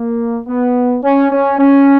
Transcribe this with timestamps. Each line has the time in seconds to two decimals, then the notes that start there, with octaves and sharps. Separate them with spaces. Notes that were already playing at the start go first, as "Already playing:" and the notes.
Already playing: A#3
0.47 B3
1.03 C#4
1.31 C#4
1.59 C#4